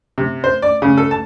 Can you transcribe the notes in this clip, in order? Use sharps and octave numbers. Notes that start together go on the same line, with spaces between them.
C3
C5
D5
C#3
A4
A5